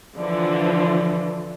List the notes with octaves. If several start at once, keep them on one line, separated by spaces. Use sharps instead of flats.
D3 E3 F3 D5